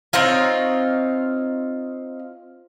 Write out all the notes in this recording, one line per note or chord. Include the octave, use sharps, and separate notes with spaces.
C4 D#4 F4 C#5